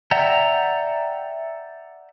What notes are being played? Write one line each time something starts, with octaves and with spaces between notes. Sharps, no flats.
D5 E5 F#5 G5 A#5